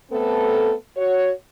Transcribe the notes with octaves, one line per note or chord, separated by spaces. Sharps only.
A3 B3 C4 A4
F#4 C#5